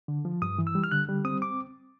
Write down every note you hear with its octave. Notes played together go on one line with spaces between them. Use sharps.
D3
F3
G2 D#6
E3
E6
G3
F6
D3 F#6
G3
C4 D#6
D6